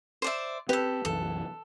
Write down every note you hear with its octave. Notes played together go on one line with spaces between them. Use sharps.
C5 D5 E5
C4 G4 A4 B4
C2 F#2 E3 A4